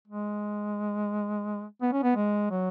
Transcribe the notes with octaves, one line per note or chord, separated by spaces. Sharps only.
G#3
B3
C#4
B3
G#3
F#3